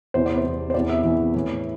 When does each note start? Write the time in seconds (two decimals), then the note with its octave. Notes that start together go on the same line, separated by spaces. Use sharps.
0.14 E2 C3 E3 C5
0.26 D5
0.38 C5
0.44 E2 C3 E3
0.70 C5
0.74 E2 C3 E3 D5
0.89 E5
1.04 E2 C3 E3
1.34 A2 E3